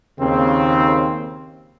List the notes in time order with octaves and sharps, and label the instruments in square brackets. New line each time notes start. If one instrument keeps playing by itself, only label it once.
[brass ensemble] D#2 C#3 C4